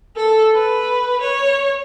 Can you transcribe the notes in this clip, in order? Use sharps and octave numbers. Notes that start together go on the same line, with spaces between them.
A4
B4
C#5